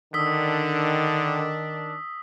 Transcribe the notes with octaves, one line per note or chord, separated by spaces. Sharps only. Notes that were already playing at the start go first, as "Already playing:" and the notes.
D3 D#3 D4 D#6 E6 B6